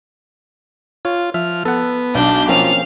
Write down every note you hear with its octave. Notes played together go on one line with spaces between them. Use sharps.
F4 C#5
F3 E5 F6
B3 A4 F#5
B1 D4 G6
F3 A#3 C4 C#4 F5